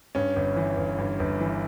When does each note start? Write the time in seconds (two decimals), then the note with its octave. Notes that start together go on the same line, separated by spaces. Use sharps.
0.15 G2 C#4
0.36 G1
0.56 E3
0.77 G1
0.98 G2
1.20 G1
1.41 E3